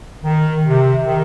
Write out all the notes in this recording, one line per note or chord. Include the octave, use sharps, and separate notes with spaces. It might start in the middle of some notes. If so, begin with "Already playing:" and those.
D#3
C3
D#3